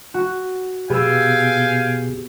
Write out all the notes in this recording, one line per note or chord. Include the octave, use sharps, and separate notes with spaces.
F#4
B2 B3 G4 G#4 F5 G5 G#5 E6